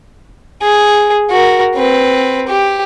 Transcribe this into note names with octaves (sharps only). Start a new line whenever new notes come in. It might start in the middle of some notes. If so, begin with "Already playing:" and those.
G#4
F#4 A#4
C4 B4
G4